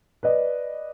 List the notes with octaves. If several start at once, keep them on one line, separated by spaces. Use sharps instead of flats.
B4 D5 D#5